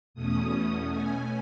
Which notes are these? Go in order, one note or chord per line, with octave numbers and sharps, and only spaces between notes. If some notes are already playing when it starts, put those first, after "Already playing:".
E2 B2 A3 C#4 D#6
B2 A3 C#4 G#5